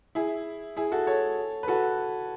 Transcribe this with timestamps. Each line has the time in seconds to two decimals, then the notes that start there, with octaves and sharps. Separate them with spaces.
0.15 E4 G#4
0.77 E4 G#4
0.92 F#4 A4
1.07 A4 C#5
1.63 B4
1.68 F#4 A4